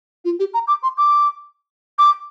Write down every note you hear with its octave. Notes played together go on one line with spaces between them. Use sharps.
F4
G4
A#5
D6
C6
D6
D6